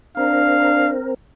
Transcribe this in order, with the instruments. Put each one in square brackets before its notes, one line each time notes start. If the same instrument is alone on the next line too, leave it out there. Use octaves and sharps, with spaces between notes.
[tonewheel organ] C4 A#4 [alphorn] D4 [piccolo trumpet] F5